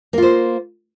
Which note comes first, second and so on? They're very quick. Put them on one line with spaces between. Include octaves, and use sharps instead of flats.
A#3 F4 C5